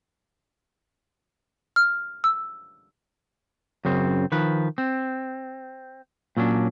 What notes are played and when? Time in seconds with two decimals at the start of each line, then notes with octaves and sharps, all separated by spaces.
1.76 F6
2.24 E6
3.85 F#2 C#3 C4
4.32 D#3 F3 B4
4.78 C4
6.37 A#2 F#3 C#4 D4